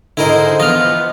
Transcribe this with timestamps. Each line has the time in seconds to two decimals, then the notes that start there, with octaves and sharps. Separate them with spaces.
0.17 G#2 D3 E4 G#4 A#4 C5 D#5
0.60 E3 F3 B3 F4 D#5 F6